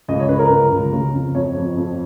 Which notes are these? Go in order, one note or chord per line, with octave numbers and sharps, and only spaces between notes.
C#2 D#5
C#5
C#2 B4
A#4
C#2
C#2
C#3
F2
F2 C#5
F2
F2